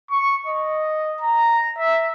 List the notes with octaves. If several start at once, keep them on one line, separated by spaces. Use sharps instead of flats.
C#6
D#5
A#5
E5